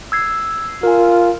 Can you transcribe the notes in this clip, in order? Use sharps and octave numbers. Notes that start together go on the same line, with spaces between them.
E6 G#6 C7
F4 A#4 G#5